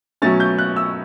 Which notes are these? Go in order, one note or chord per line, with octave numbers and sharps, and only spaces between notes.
B2 F#3 A3 C#4 A6
G6
F#6
E6